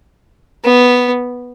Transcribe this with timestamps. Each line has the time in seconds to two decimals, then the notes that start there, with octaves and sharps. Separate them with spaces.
0.64 B3